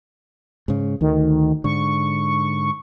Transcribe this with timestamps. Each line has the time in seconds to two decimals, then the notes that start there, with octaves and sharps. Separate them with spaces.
0.68 G#2 C#3
1.01 D2 D#3
1.64 G#2 D3 C#6